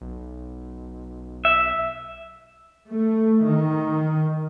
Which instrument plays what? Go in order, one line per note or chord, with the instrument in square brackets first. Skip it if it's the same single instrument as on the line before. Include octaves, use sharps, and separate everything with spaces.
[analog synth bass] B1
[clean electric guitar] E5
[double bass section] A3
D#3